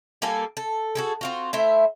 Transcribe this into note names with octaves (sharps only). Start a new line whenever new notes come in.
G3 A#3 A4 G#5
A4
F#4 G#4 A4
C4 F4 F#4
A3 E4 C5 E5